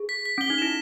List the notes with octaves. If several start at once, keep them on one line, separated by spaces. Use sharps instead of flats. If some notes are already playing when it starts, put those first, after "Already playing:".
Already playing: G#4
B6
B6
C#4 G7
D#4
E4 E7